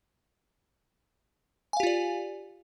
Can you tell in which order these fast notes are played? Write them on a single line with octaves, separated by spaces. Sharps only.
G#5 F5 G4 F4 D5